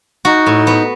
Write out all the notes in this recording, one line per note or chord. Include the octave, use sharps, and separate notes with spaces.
D#4 F#4
A2
B3